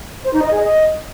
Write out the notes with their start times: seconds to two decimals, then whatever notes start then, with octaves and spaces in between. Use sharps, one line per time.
0.25 C5
0.33 D#4
0.42 D#5
0.51 G#4
0.60 D#5